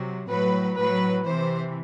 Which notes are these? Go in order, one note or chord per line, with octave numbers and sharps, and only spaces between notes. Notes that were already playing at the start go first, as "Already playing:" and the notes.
Already playing: C3 F#3
A2 F#3 B4
A2 F#3 B4
C3 E3 C5